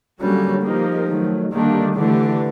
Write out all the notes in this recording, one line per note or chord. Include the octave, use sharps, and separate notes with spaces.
D3 F#3 G3 A#3 C#4 F#4
F3 A#3 D#4 G4 A#4
D#3 F#3 A3
D3 D#3 G3 A#3 D4 G4
D3 E3 A3 D4 G4